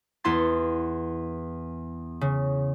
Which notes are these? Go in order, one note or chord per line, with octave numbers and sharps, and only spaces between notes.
E2 B3 E4 C6 A6
C#3